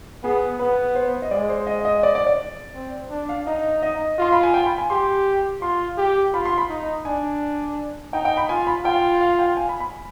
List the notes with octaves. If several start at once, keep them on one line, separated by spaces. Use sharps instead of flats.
B3 G#4
B3 B4
C5
D#5
G#3 D5
C5
D#5
D#5
D5
D5
D5
C4
D4
F5
D#4 D#5
D#5
F4 C6
B5
G#5
G5
B5
G#5
G4 C6
F4 C6
G4
F4 B5
C6
B5
D#4
D4 G#5
D#4 G5
G5
B5
F4 G#5
B5
F4 G5
F5
G5
G#5
B5
B5